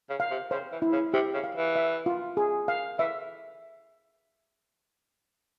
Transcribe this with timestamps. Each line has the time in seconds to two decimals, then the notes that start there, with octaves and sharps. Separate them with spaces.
0.09 C#3
0.20 F5
0.31 C3
0.51 C#3 C5
0.72 E3
0.82 E4
0.92 C#3
1.13 C3 G4
1.34 C#3
1.44 F5
1.55 E3
1.76 E5
2.06 F4
2.37 G#4
2.68 F5
2.99 E3 E5